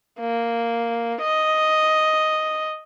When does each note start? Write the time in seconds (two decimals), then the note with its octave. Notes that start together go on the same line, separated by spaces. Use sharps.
0.19 A#3
1.22 D#5